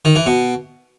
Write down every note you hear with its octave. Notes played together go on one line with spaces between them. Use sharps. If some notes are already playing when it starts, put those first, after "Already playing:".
D#3
E3
B2